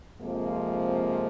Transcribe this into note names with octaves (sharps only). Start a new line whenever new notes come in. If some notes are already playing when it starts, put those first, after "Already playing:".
F2 C3 F3 G#3 A#3